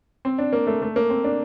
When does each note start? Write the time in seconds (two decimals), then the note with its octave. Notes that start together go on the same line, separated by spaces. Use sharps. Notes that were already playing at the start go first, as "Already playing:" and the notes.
0.25 C4
0.38 D4
0.53 A#3
0.67 A3
0.82 A3
0.96 A#3
1.10 C4
1.24 D4